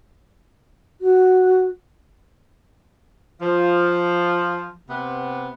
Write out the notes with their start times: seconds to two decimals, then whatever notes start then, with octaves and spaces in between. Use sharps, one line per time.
1.01 F#4
3.41 F3
4.88 C3 B3